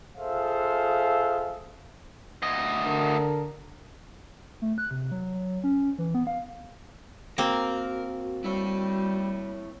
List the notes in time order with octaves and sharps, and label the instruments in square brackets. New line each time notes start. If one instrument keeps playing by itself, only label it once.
[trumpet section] F4 G#4 A4 C5 E5 F5
[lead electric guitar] D2 D#5
[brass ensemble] D3 A#4 A5
[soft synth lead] A3
F#6
C3
F#3
F#3
C#4
E3
B3
F5
[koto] A#3 C4 [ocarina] F#4 [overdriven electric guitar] A#4
[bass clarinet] G3 [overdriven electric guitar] E4 C#5